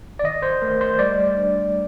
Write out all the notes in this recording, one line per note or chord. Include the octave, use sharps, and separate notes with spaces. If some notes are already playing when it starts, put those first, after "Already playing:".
D5
D#3 D#5
C5
A3 A#4
C5
G3 D5
D4